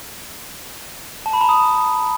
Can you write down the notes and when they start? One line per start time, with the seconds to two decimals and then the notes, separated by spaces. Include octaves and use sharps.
1.26 A5
1.33 B5
1.41 A#5
1.49 D#6